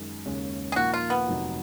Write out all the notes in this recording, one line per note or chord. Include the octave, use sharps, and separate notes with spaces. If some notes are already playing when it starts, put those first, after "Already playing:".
Already playing: F#2 D#3 G#3
D#2 C#3 G#3 C#4
G#4
A#2 F3 A#3 D#4 F#4
F4
B3
F1 F2 D#3 F#3